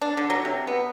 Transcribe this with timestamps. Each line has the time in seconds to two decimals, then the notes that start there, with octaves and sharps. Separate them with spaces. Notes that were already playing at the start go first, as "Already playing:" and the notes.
0.02 D4
0.17 D3
0.30 F#3
0.45 C3
0.67 B3